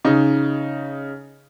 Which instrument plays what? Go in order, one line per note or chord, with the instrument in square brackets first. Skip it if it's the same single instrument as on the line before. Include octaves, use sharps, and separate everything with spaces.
[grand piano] C#3 D#4